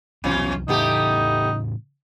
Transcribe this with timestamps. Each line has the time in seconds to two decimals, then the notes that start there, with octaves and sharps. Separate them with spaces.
0.24 C2 B2 E3 F#3 C#4 F4
0.68 A2 C#3 E3 A3 B3 D#4 G4